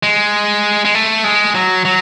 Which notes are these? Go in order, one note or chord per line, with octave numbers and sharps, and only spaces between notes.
G#3
G#3
A3
G#3
F#3
F#3